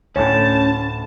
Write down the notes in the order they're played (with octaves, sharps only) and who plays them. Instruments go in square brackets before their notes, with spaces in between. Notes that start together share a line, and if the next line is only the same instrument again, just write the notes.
[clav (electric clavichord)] D2 A2 [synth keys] C#4 [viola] A5